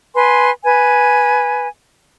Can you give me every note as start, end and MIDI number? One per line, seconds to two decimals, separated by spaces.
0.15 0.51 71
0.15 0.51 80
0.15 0.51 84
0.64 1.68 71
0.64 1.68 80